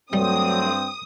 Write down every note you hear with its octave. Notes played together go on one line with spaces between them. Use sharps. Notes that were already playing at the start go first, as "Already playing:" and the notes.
G2 F#3 G3 A3 C4 D#6